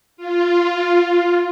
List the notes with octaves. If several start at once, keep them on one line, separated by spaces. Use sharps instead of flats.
F4